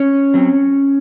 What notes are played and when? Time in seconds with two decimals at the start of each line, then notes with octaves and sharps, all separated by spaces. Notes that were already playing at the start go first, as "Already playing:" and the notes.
Already playing: C#4 C#5
0.34 F#3 C4